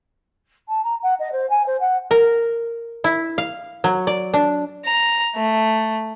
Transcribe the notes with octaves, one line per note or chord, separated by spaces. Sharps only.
A5
A#5
F#5
D#5
C5
G#5
C5
F#5
A#4
E4
F5
F#3
D5
D4
A#5
A3